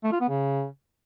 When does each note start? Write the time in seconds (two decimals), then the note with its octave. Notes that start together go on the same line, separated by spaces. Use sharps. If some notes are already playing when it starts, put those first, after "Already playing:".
0.04 A3
0.12 F4
0.20 B3
0.29 C#3